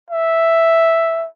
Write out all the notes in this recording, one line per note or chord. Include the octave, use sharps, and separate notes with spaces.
E5